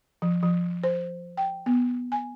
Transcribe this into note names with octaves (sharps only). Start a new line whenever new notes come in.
F3
F3
C5
G5
B3
G#5